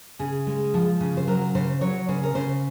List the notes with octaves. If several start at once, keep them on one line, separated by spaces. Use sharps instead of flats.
C#3 G#4
G#3
F3
C#3
C5
F#3 A#4
C#3 C5
F#3 C#5
C#3 C5
A#4
C#3 C5